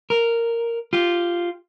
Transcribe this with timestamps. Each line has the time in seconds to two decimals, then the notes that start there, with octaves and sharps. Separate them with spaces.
0.10 A#4
0.93 F4 G4